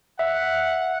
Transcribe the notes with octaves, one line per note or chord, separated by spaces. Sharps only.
E5 F#5